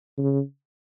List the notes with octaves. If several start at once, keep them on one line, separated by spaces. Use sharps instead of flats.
C#3